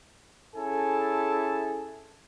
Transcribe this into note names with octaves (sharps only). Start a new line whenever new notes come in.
C#4 E4 G#4 A4 G#5 A5